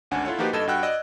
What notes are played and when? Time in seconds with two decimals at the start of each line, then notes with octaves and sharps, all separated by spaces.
0.11 G#1 D2 C#4 D4 F#5 G#5
0.25 E4 F4 A4 C#5 F#5
0.38 F3 A#3 D#4 F#4 G4 B4
0.53 G1 G2 A4 D#5 G#6 E7
0.67 G2 F#4 F#5 G5 E6 F#6
0.83 D5 D#5 E6 F#6